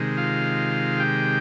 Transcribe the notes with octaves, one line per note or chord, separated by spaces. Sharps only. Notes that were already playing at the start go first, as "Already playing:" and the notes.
Already playing: C3 D#3 G#3
F4 F5
G4 G5